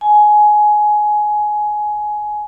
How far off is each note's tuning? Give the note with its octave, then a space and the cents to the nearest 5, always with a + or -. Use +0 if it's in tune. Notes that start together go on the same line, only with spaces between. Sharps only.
G#5 +15